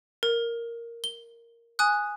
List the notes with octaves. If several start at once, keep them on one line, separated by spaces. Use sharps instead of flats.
A#4
G7
G#5 D#6 F#6